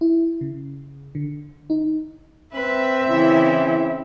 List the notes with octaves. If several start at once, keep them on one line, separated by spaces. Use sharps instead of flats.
E4
C#3
D3
D#4
C4 B4 E5
C#3 E3 E4